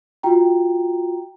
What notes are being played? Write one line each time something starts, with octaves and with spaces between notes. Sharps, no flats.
F4 F#4 G5 A#5